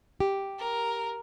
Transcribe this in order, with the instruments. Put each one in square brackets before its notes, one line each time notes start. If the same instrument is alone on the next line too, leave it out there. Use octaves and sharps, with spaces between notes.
[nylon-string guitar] G4
[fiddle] A#4